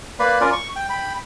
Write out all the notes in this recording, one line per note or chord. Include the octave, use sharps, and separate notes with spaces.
A#3 B4 D5 B5
C#4 F4 A#4 D5
C#6
G5
G5 B5